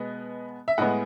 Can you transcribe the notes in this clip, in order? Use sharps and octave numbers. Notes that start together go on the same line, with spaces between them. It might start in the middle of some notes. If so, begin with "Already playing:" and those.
Already playing: B2 G#3 B3 B4 D#5
E5
A2 G#3 B3 D#5 F#5